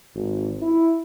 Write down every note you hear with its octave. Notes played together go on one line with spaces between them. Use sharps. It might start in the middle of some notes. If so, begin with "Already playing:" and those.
G#1
E4